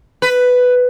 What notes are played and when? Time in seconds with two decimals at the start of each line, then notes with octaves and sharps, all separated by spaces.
0.22 B4